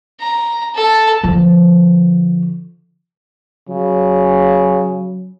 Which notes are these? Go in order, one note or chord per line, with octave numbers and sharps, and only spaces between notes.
A#5
A4 A5
D3 F3
C#3 F#3